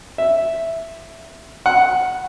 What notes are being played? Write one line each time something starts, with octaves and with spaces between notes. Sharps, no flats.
E5
F#5